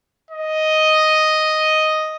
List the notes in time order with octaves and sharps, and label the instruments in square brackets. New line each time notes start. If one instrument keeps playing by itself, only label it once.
[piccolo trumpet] D#5